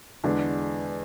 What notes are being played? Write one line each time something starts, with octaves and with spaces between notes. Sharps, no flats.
E2 D3 G#3 D4